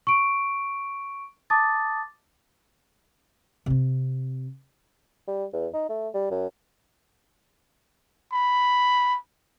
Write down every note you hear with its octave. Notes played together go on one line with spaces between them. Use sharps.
C#6 D7
A5 D6 D#6 A6
C3 C4
G3
E2
D#4
A3
G3
F#2
B5